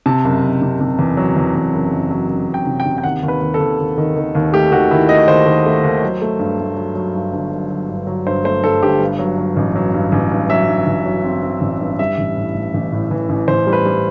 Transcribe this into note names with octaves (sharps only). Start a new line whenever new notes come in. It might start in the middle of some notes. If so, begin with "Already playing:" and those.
C3 A5
F#1
F#1
C3
C3
E2
F#3
E2
E2
F#1
F#1
F#3
F#1
F#1
G5
C3
G5
C3
G5
D#2 F#5
D#2
B4
D#2
A4
D#2
D#2
D#3
D#3
D#2
A3 G4
D#3 F#4
D#3 E4
A3 D#5
D#2 C5
D#3
A3
D#2
F#3
A3
G2
A3
F#3
F#3
G2
G1
F#3
F#3
G2
F#3
G2 C5
A3 C5
G2 A4
G1 G4
G2
F#3
F#3
A1
F#3
G2
A1
G2
F#3 E5
G2
A1
F#3
C4
C4
A1
G2
G3 E5
A1
A2
A2
A1
A2
E3
A1
A1 C5
G3
B4
G3